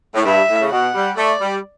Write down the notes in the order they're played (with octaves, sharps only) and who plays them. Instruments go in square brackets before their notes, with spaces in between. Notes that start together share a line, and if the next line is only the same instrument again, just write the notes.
[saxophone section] A2
[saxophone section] G2 [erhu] E5
[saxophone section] A2
C#3
[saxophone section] B2 [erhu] F#5
[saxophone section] G3
[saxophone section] A3 [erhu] D5
[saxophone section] G3